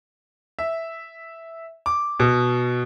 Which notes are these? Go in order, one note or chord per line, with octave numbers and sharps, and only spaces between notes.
E5
D6
B2